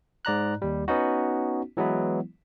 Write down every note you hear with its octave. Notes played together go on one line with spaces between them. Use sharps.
G#2 D5 A#5 F#6
D#2 G3
B3 C#4 D#4 F#4
E3 F#3 G#3 B3 E4